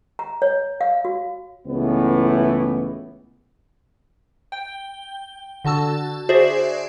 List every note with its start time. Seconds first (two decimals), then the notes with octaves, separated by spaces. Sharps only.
0.19 A#5
0.42 C#5
0.81 F5
1.05 F#4
1.66 C#2 A2 E3 B3
4.52 G5
5.65 D3 F#4 A5 E6
6.29 F#4 G#4 C5 D5 E5